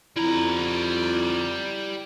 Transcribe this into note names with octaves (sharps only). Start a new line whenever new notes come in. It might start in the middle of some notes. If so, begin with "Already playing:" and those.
F2 G3 E4 A#5